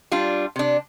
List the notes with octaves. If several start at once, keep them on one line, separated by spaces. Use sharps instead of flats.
G3 D4 F4
C3 D4